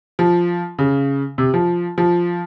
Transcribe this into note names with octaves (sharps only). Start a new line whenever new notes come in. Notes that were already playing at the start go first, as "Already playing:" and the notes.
F3
C#3
C3
F3
F3